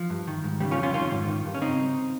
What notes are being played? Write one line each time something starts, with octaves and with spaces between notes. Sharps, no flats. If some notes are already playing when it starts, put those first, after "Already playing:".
Already playing: F3
G2
D#3
G#2
C#3 G3
C#4 F4
F2
C#4 F4
D#3 C#4 F4
G#2
D#3
G2
C#4
C#3 C4 D#4